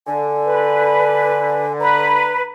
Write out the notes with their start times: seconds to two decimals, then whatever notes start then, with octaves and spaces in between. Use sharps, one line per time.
0.07 D3 G#5
0.45 B4
1.80 B4 A#5